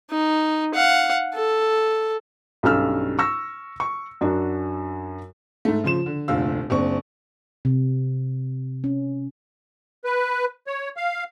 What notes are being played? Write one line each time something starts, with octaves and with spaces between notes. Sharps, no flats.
D#4
F5 F#5
A4
B1 G2 C#4 A4 E6 F6
C#6 E6 A#6
C#6
F#2 D4 F#4
G#2 A3
C#3 F3 C6 E7
D3
F1 D2 A#2 F5 E6
F#1 C4 D4 C#6
C3
C#4
B4
C#5
F5